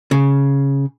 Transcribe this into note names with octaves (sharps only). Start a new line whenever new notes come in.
C#3